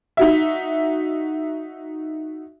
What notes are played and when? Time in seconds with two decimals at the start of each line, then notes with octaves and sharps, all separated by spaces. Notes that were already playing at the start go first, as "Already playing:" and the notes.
0.17 D#4 F#4 E5